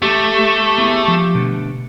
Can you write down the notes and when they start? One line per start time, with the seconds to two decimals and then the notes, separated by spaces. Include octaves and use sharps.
0.02 A3 G4
0.37 G4
0.78 B3 E4 G#4
1.08 F3
1.35 B2 D3 A3